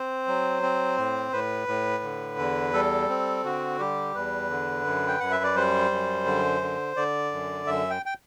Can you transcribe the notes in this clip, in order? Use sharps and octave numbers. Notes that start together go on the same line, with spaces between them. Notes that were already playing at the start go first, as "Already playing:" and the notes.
Already playing: C4 C5
F#3
C4
A2
A2 B4
A2
D3
E2
G3 A4
C4
D3 F#4
G3 G4
E2 B4
D3
F#2
G5
F#2 F#5
E5
D5
G3 C5
F#2
D3
D3
D3 D5
F#2
F#2 E5
G5
G5